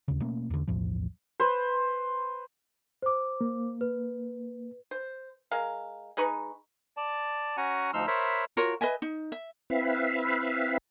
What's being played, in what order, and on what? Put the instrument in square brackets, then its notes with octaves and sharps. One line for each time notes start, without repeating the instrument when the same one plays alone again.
[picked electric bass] D#2 C#3
B2 A3 A#3 C#4
E2 D3
B1 E2 A2 F3
[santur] B4 C5
[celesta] C5 D6
[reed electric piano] A#3
[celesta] B4
[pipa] C5
G#3 A#4 F5
G#3 D#4 B4 C#6
[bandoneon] D5 A5
C#4 F#4 F#5 G#5 A#5
D2 F3 D#4 C6 E6 F6
A#4 C5 C#5 E5 B5
[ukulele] F4 F#4 A#4 C#5
B4 D#5 E5 G#5
D#4
E5
[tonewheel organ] C4 E4 B4 E5 F5